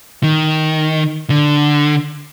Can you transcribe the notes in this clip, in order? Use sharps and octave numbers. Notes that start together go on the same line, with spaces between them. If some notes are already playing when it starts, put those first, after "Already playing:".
D#3
D3